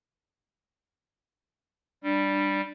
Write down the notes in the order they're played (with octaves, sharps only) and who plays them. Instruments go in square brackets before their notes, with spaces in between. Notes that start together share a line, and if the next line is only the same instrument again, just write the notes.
[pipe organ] G3 [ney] D4